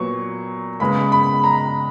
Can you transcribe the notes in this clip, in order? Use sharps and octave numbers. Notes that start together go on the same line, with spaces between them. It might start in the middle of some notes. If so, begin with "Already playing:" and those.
Already playing: A#2 F#3 B3 C#6
C#3 G#3 B3 B5
B5
A#5